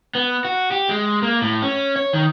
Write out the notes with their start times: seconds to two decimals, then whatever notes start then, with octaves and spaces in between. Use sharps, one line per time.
0.15 B3
0.45 F#4
0.71 G4
0.89 G#3
1.22 A#3
1.42 A2
1.62 C#4
1.96 C#5
2.13 D#3